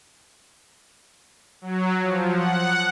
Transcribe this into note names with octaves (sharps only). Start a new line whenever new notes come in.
F#3
F3
F#5